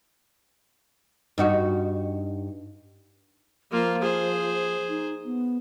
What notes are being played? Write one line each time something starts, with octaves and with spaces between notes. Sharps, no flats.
G2 D#4 F#4
F3 A#3 F4
G#4 C5
D#4
B3